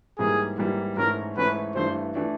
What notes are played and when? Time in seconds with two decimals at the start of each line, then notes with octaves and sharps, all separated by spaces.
0.18 G#2 E3 G3 A#3 G#4
0.58 G#2 E3 G3 A#3
0.97 G#2 E3 A3 C#4 A#4
1.37 G#2 E3 A3 C#4 B4
1.75 G2 E3 A3 D4 C5
2.15 E3 A3 D4